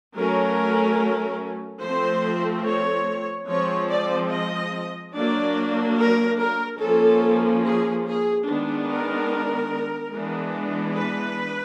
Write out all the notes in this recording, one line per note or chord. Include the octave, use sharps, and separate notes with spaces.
F#3 A3 C#4 A#4
F3 A3 C4 C5
C#5
F3 G#3 C4 C#5
D5
D#5
F#3 A#3 D4 D5
A#4
A#4
F3 A#3 C#4 A4
G#4
G#4
D#3 G#3 B3 D4
A#4
E3 G#3 B3 D4
B4